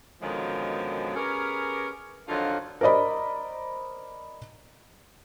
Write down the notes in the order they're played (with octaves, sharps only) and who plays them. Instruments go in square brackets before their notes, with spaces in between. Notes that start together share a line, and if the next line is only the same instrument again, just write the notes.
[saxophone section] F#2 B2 D3 D#3 F3 G#3
B3 C#4 G4 G#4 A#4
F2 D3 D#3 F#3 F4
[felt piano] A#4 C5 D5 D#5 B5